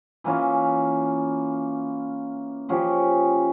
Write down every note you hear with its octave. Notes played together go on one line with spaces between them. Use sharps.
E3 A#3 C#4 F4
C#3 F3 C#4 G4